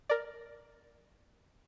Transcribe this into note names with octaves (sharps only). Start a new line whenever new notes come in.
A#4 D5